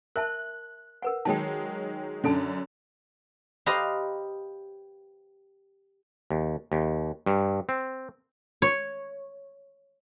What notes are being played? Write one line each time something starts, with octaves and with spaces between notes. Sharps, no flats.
A#4 E5 A5 F#6
A#4 B4 F#5
D#3 F#3 G#3 G5 A5
F#2 D3 C#4 A4 A5
G4 B4 C5 D#5 F5 A#5
D#2
D#2
G2
C4
C#5